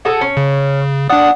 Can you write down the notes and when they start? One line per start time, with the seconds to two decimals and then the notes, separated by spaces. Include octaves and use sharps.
0.05 F#4 G#4 A4
0.21 C#4
0.37 C#3
1.10 D4 D5 F#5 D#6